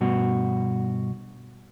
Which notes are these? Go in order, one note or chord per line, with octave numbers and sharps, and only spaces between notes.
G2 B2 F#4